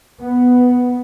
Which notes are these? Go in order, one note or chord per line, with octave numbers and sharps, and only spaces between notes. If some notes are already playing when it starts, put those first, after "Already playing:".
B3